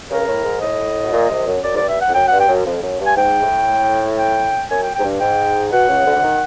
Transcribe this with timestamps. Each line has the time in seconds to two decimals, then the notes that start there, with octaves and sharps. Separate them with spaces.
0.10 C#2 C#3 A#4
0.27 A2
0.44 G#2
0.61 A2 D#5
1.03 B2
1.12 A#2
1.29 C2 C3
1.46 F#2
1.63 F#2 D5
1.74 G#2
1.76 G2 D5
1.89 E5
2.01 F#5
2.08 F2
2.14 F#2 G5
2.28 G2 F#5
2.40 G5
2.48 F#2
2.65 F2
2.82 F#2
2.99 G2
3.06 G#5
3.16 G#2 G5
3.41 A2
4.18 G5
4.70 F#2 G#5
4.83 G5
4.95 G#2 G5
5.03 G2
5.20 G#2 G5
5.71 B2 F#5
5.88 C#2 C#3
6.05 D2 D3
6.16 D3
6.23 D#3